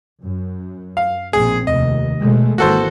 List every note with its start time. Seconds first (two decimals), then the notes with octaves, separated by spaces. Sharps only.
0.23 F#2
0.97 F5
1.33 A#1 B2 C4 G#4
1.67 F1 D#2 D#5
2.19 B2 G#3 A3
2.58 G#1 E3 A#3 F#4 A4 C5